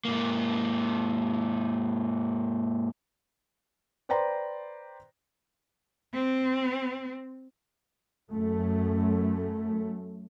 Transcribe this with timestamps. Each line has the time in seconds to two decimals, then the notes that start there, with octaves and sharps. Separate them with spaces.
0.05 G#2 A#3
4.09 B4 C5 D5 G5 A#5 C6
6.14 C4
8.32 F#2 A3